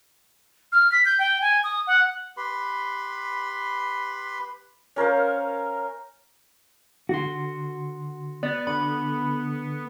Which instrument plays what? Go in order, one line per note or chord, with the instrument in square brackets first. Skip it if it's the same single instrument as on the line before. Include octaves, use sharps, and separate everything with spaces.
[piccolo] F6
B6
G6
G5
G#5
D#6
F#5
[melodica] G4 B4 B5 C6
[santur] C#4 A#4 C5 F5
[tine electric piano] D3 C6 [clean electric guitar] F#4
[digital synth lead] B3 [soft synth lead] D5
[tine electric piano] D3 [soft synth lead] B5